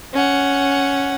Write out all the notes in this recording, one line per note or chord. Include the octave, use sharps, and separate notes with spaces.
C#4 F#5